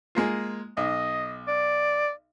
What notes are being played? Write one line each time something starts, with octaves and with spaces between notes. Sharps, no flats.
G#3 A#3 F4
B1 D#5
D5